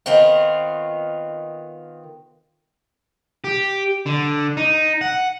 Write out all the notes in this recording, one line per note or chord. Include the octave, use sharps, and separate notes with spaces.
D#3 B3 C4 F4
G4
D3
D#4
F#5